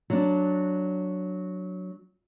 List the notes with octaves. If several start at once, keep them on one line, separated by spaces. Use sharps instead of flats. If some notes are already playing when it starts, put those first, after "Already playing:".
F#3 D4